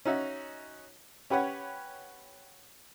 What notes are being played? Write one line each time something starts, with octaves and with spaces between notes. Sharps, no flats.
C#4 D#4 F#4 E5
C#4 G4 B4 C#5 F#5